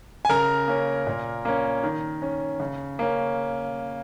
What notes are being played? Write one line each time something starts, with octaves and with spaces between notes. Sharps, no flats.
G#5
C#3 A#4 A#5
A#3 C#4
A#2
A#3 C#4
D#3
C#4
C#3
A#3 C#4